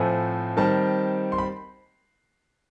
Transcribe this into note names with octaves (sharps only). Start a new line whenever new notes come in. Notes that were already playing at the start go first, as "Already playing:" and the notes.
Already playing: A2 F3 A3 C4 G#5
D#3 G3 C4 A5
C6
B5